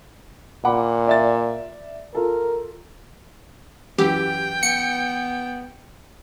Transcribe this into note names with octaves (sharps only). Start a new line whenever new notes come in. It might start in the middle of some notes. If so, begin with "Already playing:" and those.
A#2 F#5 B5 D6
D5 E5 A6
F4 A4 A#4
F#2 E3 G4 G5
B3 C#7